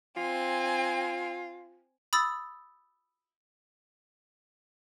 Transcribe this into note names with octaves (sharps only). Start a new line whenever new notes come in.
C4 F4 G#5
B5 D#6 E6 A6